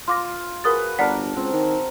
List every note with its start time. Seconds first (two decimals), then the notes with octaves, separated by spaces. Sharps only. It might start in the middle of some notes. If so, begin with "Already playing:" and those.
0.08 F4 C6 D6 A#6
0.64 F#4 G#4 A#4 B4 D#6 A6
0.99 G1 D4 A#4 D5 F#5 A5 B6
1.36 C#2 C4
1.53 D#3